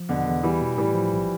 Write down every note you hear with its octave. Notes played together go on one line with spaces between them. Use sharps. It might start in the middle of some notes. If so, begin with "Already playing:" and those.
Already playing: F3
E2 B2 D3
E2
E2 E3 G3
B2
A2 E3 G3
F3
B1